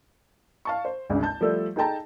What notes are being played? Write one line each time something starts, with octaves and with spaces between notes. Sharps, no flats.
F5 A5 C#6
C5
G#1 D2 C#3
A5 G6
F3 G3 A3 A4 D5
D#4 G#4 A4 G5 A5 A#5